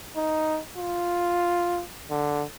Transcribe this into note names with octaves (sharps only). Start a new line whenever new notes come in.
D#4
F4
D3